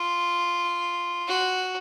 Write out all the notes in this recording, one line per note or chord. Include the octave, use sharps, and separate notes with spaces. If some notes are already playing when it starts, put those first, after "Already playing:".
Already playing: F4
F#4